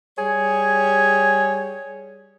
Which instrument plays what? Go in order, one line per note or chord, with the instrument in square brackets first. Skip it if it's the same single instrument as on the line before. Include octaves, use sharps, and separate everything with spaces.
[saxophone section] G3 G#4 C#5